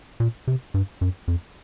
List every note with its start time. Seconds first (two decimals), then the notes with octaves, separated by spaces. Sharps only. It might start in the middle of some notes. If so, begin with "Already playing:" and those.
0.20 A#2
0.47 C3
0.74 G2
1.01 F#2
1.28 F2